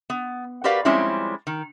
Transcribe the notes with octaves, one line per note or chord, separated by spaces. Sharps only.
B3
F#4 G4 A#4 B4 D5 F5
F3 G3 G#3 C4 C#4 E4
D#3